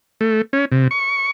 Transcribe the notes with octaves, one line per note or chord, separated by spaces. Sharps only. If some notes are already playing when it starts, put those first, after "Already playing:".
A3
C#4
C3
C#6